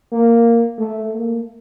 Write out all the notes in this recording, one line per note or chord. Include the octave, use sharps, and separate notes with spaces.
A#3
A3
A#3